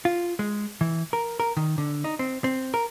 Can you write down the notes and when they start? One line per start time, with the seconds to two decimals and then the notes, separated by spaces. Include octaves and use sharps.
0.05 F4
0.39 G#3
0.81 E3
1.13 A#4
1.40 A#4
1.57 D#3
1.78 D3
2.04 D#4
2.19 C4
2.44 C4
2.74 A#4